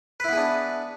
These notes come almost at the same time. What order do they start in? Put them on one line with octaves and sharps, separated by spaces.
B4 E4 B3 G#4 D4